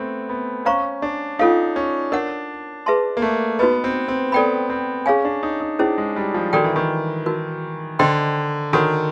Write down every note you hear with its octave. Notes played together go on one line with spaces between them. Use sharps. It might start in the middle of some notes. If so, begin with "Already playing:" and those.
Already playing: A3 B3 C4
B3
C#4 C5 F5 A#5 C#6
D4
C#4 D#4 F4 A4 C#5 F5
C#4
D4 A#4 C#5 F#5
G#4 B4 E5 A5 C6
A#3
A3
B3 D#4 F#4 B4 D#5
C4
C4
B3 A4 D5 G5 B5
C4
C#4 G#4 C#5 F5 G#5
D4
D#4
D#4
C#4 D4 E4 G#4 C5
G#3
G3
F3
D#3 D4 F#4 A4 D5 G5
E3
D#3
D#4 F#4 A#4
D3 C5 D#5 G5 C6
D#3 D4 F#4 A4 C#5 F#5